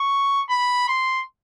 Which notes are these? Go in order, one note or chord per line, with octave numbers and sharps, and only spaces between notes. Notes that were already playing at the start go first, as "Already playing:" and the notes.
Already playing: C#6
B5
C6